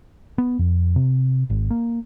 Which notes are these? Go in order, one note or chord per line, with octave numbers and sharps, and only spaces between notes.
B3
F2
C3
G#1
A#3